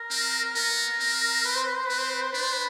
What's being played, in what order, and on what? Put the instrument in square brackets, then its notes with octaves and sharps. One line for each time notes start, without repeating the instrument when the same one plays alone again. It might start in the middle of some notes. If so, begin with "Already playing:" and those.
Already playing: [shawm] A#4
[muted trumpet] C4
[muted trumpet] B3 [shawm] A#4
[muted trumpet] C4
[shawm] B4
C5
B4
C5
[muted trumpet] C4 [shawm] B4
[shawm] C5
B4
C5
[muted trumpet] D4 [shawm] B4
[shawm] C5
B4